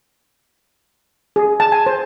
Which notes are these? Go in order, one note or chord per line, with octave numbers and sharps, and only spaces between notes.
G#4
A5
G#5
C5